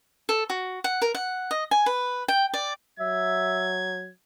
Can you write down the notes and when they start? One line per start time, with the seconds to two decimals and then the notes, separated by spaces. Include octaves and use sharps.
0.29 A4
0.50 F#4
0.84 F#5
1.02 A#4
1.15 F#5
1.51 D#5
1.71 G#5
1.86 B4
2.28 G5
2.54 D5
3.00 F#3 E5 G#6